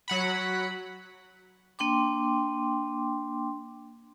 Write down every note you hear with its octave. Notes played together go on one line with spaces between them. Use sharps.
F#3 F#5 B5
A#3 D4 G5 C6 D6